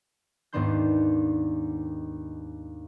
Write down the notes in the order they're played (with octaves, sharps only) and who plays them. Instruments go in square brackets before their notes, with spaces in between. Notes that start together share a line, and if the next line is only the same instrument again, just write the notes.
[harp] D#2 G#2 B3 D4 C6 G6